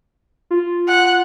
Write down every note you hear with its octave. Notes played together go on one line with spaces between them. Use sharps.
F4
F#5